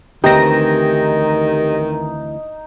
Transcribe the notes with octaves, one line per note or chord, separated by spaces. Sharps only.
D2 D#3 E3 C4 D#4 G4 A#6